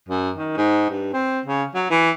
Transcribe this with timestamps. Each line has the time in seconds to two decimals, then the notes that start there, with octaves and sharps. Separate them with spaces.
0.08 F#2
0.36 D#3
0.57 G#2
0.90 G2
1.13 C4
1.46 C#3
1.74 F#3
1.90 E3